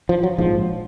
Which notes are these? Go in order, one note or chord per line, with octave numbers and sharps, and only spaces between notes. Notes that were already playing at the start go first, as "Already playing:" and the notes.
F3
F#3
A#1 G#2 F3